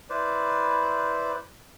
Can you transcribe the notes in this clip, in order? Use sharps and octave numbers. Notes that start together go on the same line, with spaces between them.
E4 B4 C5 D5